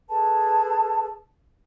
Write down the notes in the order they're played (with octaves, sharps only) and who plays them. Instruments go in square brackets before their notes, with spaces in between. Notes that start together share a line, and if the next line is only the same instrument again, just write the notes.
[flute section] G#4 A4 B4 A5